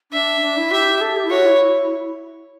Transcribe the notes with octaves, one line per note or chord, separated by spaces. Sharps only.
D4 E5
D4
E4
G4 E5
A4
G4
E4
F#4 C#5
E4